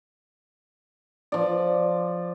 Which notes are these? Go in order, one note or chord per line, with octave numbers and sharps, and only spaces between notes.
F3 D5